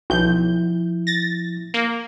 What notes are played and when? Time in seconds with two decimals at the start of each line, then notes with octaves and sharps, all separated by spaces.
0.10 B1 F3 E4 G6
1.07 A6 A#6
1.74 A#3